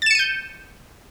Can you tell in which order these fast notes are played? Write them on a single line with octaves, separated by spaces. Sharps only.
A6 E7 C#7 D#7 G6